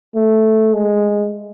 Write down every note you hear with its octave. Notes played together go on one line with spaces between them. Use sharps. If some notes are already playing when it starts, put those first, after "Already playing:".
A3
G#3